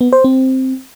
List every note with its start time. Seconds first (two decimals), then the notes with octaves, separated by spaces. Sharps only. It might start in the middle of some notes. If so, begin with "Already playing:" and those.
0.01 B3
0.13 C5
0.24 C4